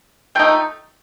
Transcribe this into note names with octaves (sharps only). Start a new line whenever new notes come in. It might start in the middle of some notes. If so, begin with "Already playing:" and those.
F3 A3 D#4 G5